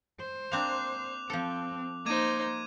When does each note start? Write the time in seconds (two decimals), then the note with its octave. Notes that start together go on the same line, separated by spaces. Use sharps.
0.20 C5
0.52 A#3 C4 D4 D6 F#6 F7
1.30 F3 C4 A4
2.06 A#3 D#4 C5 D6 G#6 D#7